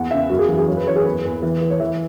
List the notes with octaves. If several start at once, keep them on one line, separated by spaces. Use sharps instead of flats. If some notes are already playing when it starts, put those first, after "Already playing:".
Already playing: E2 F#5
C#3 E5
F#2 F#4
G#4
E3 F#4
G#4
F#2 C#5
B4
E3 C#5
G#4
E2 B4
E2
E3
E3
C#5
E3 E5